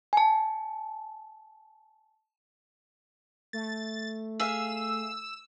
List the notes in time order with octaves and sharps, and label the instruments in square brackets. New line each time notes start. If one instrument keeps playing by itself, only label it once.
[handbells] G#5 A5
[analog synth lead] A3 [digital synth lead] A6
[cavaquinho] G#4 E5 F5 [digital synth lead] E6